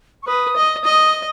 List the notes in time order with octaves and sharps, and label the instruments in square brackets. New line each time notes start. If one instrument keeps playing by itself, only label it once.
[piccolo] C#6
[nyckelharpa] B4 [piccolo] D#6
[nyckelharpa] D#5
D#5